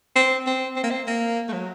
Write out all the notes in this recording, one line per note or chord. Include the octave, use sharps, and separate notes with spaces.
C4
C4
C4
A#3
C4
A#3
A3
F#3